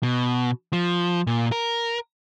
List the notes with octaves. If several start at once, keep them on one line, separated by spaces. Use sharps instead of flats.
B2
F3
A#2
A#4